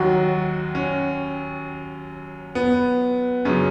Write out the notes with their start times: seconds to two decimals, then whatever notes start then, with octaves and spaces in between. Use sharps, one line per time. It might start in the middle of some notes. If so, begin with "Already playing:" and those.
Already playing: D#2 D#3 F#3 F#4
0.75 C#4
2.55 B3
3.45 F#2 C#3 F#3 C#4